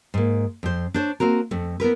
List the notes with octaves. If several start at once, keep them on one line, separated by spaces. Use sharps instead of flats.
G#2 A#3
F2 C5
D4 C5 C#5
A#3 C4 F#4 A#4
F2 A3
B3 E4 A#4 B4